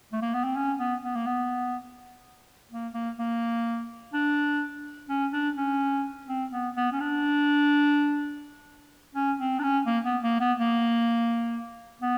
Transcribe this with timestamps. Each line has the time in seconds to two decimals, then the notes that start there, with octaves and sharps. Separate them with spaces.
0.12 A3
0.22 A#3
0.34 B3
0.44 C4
0.56 C#4
0.79 B3
1.04 B3
1.15 A#3
1.26 B3
2.71 A#3
2.94 A#3
3.19 A#3
4.13 D4
5.09 C#4
5.33 D4
5.57 C#4
6.28 C4
6.52 B3
6.77 B3
6.92 C#4
7.00 D4
9.15 C#4
9.39 C4
9.59 D4
9.63 C#4
9.86 A#3
10.05 B3
10.23 A#3
10.40 B3
10.59 A#3
12.02 B3